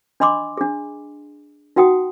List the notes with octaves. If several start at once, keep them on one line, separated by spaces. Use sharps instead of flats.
D4 D#5 B5 C6 D6
D4 G#4
D#4 F#4 F#5 G5 D#6